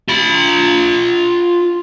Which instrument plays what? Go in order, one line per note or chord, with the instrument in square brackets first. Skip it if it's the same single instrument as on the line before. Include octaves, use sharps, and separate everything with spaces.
[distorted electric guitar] F4 B5